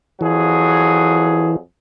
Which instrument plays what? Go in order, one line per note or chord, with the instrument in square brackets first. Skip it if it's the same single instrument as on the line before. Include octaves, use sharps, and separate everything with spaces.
[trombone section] F2 F#3 G#4 [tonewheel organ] E3